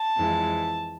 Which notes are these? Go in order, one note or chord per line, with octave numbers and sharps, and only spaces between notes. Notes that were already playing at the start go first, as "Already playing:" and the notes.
Already playing: A5
F2 E3 G#3